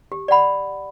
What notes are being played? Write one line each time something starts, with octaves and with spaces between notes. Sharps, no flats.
G4
D5 F#5 B5